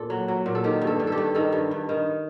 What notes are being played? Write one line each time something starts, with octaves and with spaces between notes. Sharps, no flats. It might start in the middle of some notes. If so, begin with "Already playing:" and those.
Already playing: A#2 A4
F#3
F#3
A#2
A4
D#3 G4
G2
A4
G2
G4 A4
G2
D#3 A4
G2
G2
D#3